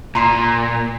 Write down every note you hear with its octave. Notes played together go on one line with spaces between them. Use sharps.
A#2 A#5 C6 C7